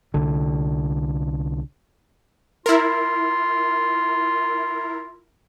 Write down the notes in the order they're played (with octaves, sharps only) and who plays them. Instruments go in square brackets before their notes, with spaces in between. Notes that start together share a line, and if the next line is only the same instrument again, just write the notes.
[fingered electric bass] C2 D3
[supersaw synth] E4 A#4 [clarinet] F4